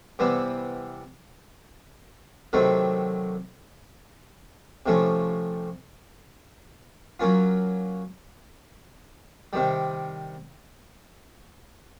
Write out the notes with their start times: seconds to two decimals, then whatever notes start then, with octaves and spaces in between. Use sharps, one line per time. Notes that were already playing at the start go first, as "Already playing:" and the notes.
0.19 C3 E3 G3 B3 E4
2.53 C3 D#3 F#3 A3 C4
4.86 C3 F3 A3 C#4
7.20 F#3 A#3 C#4 F4
9.53 C3 D#3 G3